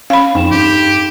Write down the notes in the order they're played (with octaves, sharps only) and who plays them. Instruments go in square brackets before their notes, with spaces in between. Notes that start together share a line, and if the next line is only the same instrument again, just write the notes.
[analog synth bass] C#4 [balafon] F5 B5
[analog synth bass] F2 [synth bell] D#4 G5 E7
[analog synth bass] G2 [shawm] G4